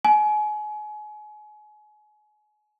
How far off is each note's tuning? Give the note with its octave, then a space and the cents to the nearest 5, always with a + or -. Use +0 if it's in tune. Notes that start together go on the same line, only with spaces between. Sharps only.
G#5 +30